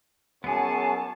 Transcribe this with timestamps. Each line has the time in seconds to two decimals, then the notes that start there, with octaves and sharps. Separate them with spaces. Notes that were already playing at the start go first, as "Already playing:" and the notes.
0.44 F#2 B3 G#4 C#5 G#5 A5 C#7